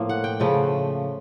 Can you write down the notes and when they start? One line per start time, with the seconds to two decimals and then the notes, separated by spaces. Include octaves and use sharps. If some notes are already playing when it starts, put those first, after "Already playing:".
Already playing: A2 F3 A#3
0.09 F#5
0.24 G5
0.40 C#3 F3 A3